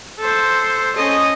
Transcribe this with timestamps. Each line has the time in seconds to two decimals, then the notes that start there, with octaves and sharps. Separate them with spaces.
0.19 A4 C5
0.96 C#4 D#5